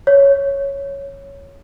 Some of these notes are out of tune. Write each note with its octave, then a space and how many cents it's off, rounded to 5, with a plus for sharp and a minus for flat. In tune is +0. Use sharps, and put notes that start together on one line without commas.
C#5 +0